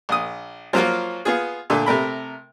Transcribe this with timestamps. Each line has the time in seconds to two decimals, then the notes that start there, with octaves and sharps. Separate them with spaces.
0.09 A#1 D#6
0.73 F3 F#3 A#3 F4
1.25 B3 F4 G#4
1.70 A#2 D3 A3
1.86 C3 A3 A#4 B5